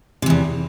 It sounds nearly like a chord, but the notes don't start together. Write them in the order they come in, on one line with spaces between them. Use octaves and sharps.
C3 E3 E2